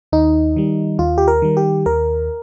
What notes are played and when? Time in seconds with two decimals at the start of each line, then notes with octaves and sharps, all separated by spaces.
0.13 D#2 D#4
0.56 D#3 G3
0.98 D#2 F4
1.18 G4
1.28 A#4
1.42 D#3 G3
1.57 G4
1.86 D#2 A#4